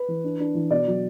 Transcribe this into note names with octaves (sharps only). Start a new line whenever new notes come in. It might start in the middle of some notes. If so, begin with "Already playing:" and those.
Already playing: B4
E3
D4
D4
E3
B2 D5
F#3